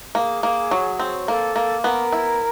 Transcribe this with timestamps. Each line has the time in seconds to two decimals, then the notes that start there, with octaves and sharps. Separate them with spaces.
0.15 A#3 G#4
0.43 A#3
0.71 F#3
1.00 C4
1.28 A#3 A4
1.56 A#3
1.84 B3 A#4
2.13 E4